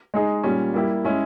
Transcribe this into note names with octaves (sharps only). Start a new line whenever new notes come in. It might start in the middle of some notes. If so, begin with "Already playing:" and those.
G#3 D#4 G#4
A#2 G3 C#4
G3 A#3 E4 G4
G#3 C#4 E4